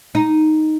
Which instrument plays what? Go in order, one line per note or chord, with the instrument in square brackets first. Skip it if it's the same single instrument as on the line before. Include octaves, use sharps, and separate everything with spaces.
[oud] D#4